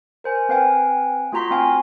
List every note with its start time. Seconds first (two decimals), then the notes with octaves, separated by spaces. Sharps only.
0.24 A#4 C5 G#5
0.49 C4 B4 F5 G5 G#5
1.32 A3 F4 F#4 A#5 C6 B6
1.51 C4 F5 G#5